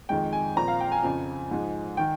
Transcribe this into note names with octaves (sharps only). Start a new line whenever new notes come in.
F2 D#3 G#3 G5
G#5
A#2 F3 C4 A#5
F5
G5
G#5
F2 C#3 F3
G#2 F3 G#3
D#3 G5